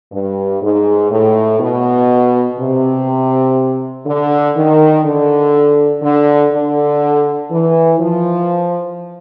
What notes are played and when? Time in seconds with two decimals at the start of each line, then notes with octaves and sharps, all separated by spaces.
0.12 G2
0.62 G#2
1.11 A2
1.60 B2
2.59 C3
4.06 D3
4.56 D#3
5.05 D3
6.03 D3
6.52 D3
7.51 E3
8.00 F3